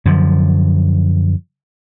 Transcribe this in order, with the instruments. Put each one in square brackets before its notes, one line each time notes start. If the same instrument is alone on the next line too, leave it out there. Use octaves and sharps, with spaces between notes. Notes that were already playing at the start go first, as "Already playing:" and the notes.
[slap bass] F#2 D3 F3